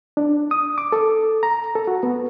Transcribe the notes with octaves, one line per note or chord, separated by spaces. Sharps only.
D4
D#6
D6
A4
A#5
A4
F#4
B3